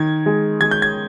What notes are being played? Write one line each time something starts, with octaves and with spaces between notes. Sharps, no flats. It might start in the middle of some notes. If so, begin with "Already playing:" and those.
Already playing: D#3 G#6
G#3
G#3 G#6
G6
G#6